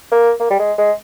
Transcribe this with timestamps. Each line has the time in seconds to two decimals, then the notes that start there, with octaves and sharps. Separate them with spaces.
0.12 A#3
0.40 A#3
0.51 G3
0.59 G#3
0.78 G#3